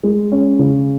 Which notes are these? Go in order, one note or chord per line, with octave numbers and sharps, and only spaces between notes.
G#3
C#4
C#3